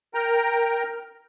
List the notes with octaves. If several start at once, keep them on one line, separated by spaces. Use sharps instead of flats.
A#4 G5 A#5